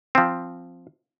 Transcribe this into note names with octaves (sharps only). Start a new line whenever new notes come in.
F3 C4